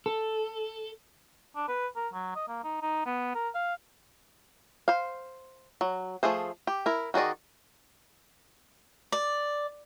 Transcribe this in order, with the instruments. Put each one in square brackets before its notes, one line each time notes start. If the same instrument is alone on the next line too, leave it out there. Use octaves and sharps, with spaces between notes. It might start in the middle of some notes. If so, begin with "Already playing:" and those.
[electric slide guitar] A4
[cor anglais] D4
B4
A#4
F#3
D#5
A#3
D#4
D#4
B3
A#4
F5
[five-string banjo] C5 F5
F#3
F3 A3 G#4 C5
G4
E4 A#4
D#3 F#4 G#4 D5 D#5
[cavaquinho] D5